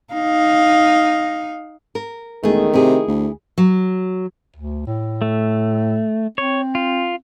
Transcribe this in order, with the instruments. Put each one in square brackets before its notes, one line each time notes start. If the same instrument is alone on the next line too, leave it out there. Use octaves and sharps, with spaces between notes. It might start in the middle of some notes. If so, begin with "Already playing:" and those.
[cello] D#4 F5
[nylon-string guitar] A#4
[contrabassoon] E1 [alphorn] D#3 [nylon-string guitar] A3 G#4
[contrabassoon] C3 [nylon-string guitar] E4 G#4
[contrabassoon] D2
[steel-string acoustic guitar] F#3
[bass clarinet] D2
A2
[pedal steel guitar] A3
[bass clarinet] C4 [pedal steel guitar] C#5
[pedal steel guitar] F4